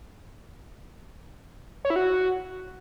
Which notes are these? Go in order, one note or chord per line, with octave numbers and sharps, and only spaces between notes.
C#5
E4
F#4